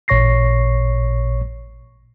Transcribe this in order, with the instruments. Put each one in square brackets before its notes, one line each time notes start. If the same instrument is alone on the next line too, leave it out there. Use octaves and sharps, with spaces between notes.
[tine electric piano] A1 A#2 C#5 C#6 A#6 C7